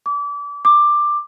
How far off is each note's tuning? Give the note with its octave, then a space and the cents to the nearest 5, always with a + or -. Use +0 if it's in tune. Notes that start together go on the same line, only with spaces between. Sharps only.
D6 -30
D6 +10